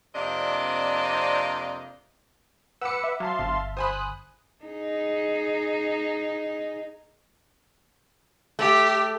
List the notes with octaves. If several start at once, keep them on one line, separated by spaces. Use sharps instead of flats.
F2 C3 A#3 D4 D5 D#5
B4 F#5 D6 E6 C#7
E5
F#3 F5 A5 C6
G1
C5 G#5 B5 D#6 F#6
D#4 G#4
A3 G4